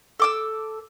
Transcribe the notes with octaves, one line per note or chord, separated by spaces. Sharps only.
A4 D6 E6